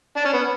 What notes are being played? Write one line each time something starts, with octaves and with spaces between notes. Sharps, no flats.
D4
C#4
B3